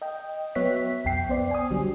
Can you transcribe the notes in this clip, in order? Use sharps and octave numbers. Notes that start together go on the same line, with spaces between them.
D#5 G5
F#3 B3 C#5 E5 F#6 B6
B1 F2 G5 C7
B3 C5 D5
G#5 D#6
B1 D3 F#3 G3